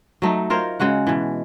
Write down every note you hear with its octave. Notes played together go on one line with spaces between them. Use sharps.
F#3 A3 D#4
F4 A#4 C5 C#5
C#3 G#3 F#4 F#5
B2 E3